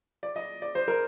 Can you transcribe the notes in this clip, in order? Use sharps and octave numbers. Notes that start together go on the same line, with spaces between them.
D5
D#5
D5
C5
A#4